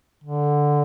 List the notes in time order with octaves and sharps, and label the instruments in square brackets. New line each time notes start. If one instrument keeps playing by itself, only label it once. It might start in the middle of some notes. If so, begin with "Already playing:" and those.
[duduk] D3